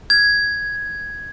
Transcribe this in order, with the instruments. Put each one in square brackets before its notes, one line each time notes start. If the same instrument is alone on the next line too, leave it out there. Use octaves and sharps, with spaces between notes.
[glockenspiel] G#6